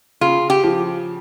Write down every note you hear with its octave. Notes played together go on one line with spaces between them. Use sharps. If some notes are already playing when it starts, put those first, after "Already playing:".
C#3 F4
G4
F3